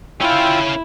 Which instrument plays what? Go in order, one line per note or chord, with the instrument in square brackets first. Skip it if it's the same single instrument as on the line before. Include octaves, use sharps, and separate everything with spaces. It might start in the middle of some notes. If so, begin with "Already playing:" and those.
[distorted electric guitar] C#4 F5 [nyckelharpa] E4 [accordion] F4 G5 E6